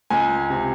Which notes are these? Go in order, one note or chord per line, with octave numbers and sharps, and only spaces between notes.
C#2 G#5
C3